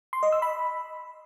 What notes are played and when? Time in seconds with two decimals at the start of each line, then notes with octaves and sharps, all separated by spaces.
0.13 C6
0.23 D#5
0.32 E6
0.42 B5